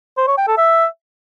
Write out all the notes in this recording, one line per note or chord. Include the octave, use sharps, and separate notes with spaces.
C5
C#5
G5
A4
E5